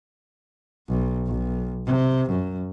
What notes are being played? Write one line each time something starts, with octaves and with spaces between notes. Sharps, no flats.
B1
B1
C3
F#2